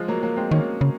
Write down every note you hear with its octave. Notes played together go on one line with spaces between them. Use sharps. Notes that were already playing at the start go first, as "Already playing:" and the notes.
Already playing: F3 G#3
F#3 A#3
F#3 A#3
G#3 C4
D#3 A#3 C#4
C#3